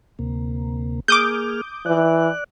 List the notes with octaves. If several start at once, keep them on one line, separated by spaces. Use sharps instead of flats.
D2 C3 A#3
A#3 G#4 D6 D#6 F6 G6
E3 D5 F#6